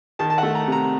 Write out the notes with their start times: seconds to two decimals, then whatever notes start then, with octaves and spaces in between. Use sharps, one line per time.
0.19 D#3 A5
0.30 A5
0.38 F#5
0.43 A3
0.55 A#5
0.67 C3
0.72 A#5